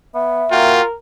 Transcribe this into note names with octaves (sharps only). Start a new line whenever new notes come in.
B3 E5
A#3 F4 F#4 A#4 G5